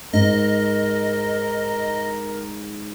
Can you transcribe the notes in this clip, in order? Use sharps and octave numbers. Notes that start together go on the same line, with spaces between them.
G#2 A#4 D#5